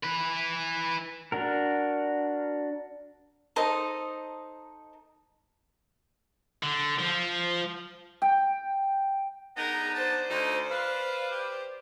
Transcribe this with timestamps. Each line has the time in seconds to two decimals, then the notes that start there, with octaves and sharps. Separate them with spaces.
0.04 E4 B4
1.32 D4 F#4 A#4
3.56 D#4 A4 C5 D#5
6.63 D3
6.99 F3
8.22 G5
9.57 D3 B3 D#4 G#4 A#4 A#5
9.95 C5 D5 A5
10.30 D2 D#4
10.71 B4 F5
11.32 G4